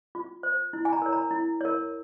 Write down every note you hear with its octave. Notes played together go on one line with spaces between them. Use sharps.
F4
C5
E4
G#5
A#5
A#4 C#5
A#5
E4
A#4 C#5